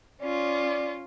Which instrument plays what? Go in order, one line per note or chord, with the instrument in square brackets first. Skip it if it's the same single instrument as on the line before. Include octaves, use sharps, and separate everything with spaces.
[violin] C#4 F4 [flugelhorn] D5